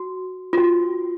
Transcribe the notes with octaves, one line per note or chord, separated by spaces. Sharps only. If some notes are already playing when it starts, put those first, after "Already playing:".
Already playing: F#4
F4
F#4